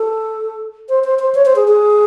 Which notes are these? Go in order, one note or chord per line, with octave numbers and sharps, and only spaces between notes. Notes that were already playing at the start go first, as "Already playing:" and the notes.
Already playing: A4
C5
C5
C5
C#5
C5
G#4
G#4